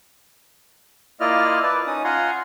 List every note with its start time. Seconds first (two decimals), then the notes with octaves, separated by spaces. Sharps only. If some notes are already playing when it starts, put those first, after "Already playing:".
1.20 A#3 E4 F4 D5 D#5 F6
1.63 B4 D5 A5
1.87 C#4 D#4 D#6
2.04 F4 F#5 G#5 A#5 C6